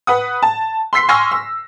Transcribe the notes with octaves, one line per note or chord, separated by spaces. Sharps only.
B4 F#5 D#6
A5
C6 E6 B6 C7
G#5 C6 C#6 E6 F6 A#6
E6